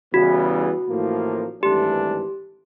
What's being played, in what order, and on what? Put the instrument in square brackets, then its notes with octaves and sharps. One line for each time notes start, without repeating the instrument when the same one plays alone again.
[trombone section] E2 C#3 E3 G3 B3 [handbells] F#4
[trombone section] A1 A2 F3 A#3
[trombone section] G#1 G2 E3 A3 D4 [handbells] G4